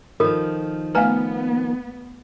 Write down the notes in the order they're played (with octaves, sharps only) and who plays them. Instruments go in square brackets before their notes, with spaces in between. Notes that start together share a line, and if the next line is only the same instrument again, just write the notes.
[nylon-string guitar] D#3 F3 [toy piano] F4 A4 A#4
[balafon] A3 G#5 A#5 [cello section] B3 [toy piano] B4 F5